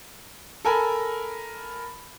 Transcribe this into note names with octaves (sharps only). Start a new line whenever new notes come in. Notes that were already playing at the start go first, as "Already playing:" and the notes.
A4 A#4 G#5 B5